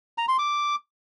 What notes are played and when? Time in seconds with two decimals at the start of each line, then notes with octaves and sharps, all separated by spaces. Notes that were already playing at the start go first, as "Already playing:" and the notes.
0.18 A#5
0.28 C6
0.39 D6